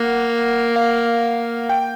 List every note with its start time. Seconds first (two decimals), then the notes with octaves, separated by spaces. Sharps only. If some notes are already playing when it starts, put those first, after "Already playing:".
Already playing: A#3 F#5
0.76 F5
1.69 G5